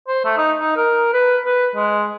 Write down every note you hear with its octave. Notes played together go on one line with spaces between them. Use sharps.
C5
A3
D#4
D#4
A#4
B4
B4
G#3